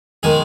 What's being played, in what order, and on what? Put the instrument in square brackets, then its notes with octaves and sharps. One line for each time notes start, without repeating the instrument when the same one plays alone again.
[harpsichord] D#3 G#3 G#4